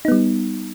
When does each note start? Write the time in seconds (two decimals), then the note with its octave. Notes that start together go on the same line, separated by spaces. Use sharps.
0.05 D#4
0.08 B3
0.12 G3